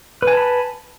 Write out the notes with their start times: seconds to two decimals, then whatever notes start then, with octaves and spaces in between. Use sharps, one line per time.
0.22 B4
0.27 G#5
0.32 A5
0.37 B5